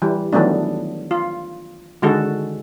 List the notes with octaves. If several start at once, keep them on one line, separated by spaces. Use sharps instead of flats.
E3 G3
D#3 E3 F#3 A3 B3 D4
F4
D3 D#3 G#3 F#4 A4